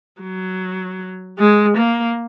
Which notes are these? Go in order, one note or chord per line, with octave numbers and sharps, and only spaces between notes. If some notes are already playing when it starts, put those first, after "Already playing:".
F#3
G#3
A#3